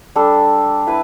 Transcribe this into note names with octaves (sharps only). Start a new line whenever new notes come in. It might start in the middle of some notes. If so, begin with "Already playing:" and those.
G3 D4 A4
E4 B4